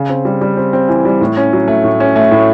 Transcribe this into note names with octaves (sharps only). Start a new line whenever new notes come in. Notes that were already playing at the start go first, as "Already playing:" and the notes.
Already playing: C#3
C4
G3
G3
C4
C4
E3
G3
A2
C#4
F#3
A3
A2
C#4
A3
A2